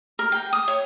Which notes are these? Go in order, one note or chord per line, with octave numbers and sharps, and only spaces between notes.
A#4
G5
D#6
C#5